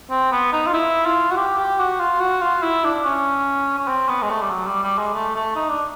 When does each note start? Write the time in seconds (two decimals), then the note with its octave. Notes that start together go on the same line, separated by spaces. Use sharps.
0.11 C4
0.32 B3
0.53 D#4
0.67 F4
0.74 E4
1.06 F4
1.31 F#4
1.37 G4
1.58 G4
1.79 F#4
2.00 F4
2.20 F#4
2.42 F4
2.63 E4
2.84 D4
3.05 C#4
3.79 C#4
3.88 C4
4.09 B3
4.22 G#3
4.30 A3
4.41 G3
4.51 F#3
4.67 G3
4.83 G3
4.98 G#3
5.14 A3
5.36 A3
5.56 D#4
5.69 D4